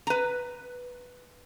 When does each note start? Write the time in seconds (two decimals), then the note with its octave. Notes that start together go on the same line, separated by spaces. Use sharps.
0.07 B4 A#5